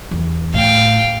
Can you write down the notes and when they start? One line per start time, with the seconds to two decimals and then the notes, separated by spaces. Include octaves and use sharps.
0.11 E2
0.54 A2 F5 G5